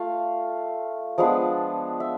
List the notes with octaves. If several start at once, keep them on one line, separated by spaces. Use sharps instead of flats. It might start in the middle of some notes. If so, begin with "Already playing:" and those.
Already playing: A3 F4 F5
F3 G#3 B3 D4
E5